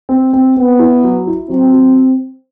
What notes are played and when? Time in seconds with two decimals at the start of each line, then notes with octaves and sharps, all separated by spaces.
0.09 C4
0.33 C4
0.56 B3 C4
0.79 E4
1.04 F#3
1.27 E4
1.50 F#3 C4
1.73 F#3